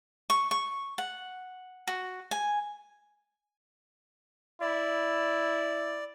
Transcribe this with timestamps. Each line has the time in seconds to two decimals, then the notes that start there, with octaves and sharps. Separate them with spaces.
0.30 C#6
0.51 C#6
0.98 F#5
1.87 F#4
2.31 G#5
4.61 E4 D5